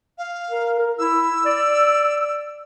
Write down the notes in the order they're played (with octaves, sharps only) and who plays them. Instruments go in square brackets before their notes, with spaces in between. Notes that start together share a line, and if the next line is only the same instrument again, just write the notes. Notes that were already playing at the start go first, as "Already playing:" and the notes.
[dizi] F5
[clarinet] A#4
A#4
[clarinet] E4 [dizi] E6
[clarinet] D5